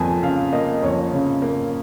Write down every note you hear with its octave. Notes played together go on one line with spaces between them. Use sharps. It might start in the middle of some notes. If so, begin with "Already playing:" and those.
Already playing: F2 A#3 G#5
C#3 F5
A#3 D#5
F2 C#5
C#3
A#3